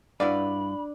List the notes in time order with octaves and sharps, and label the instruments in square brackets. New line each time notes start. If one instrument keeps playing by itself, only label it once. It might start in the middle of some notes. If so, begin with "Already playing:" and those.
[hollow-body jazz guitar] G2 B4 F5 [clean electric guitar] D4 [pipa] E4 F#4 D5 [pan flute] B5